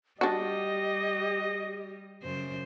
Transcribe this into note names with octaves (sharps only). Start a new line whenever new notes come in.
G3 D4 F#4 G4 D#5
F#2 C#3 C5